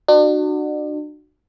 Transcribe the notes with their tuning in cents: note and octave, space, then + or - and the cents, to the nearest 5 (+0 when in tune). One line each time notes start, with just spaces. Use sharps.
D4 +40 F#4 +0